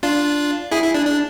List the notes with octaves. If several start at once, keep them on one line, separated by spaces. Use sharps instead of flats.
D4 F4
E4 G#4
E4
D4
D4